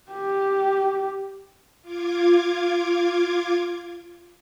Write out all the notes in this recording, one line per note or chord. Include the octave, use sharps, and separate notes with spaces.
G4
F4 D6 G#6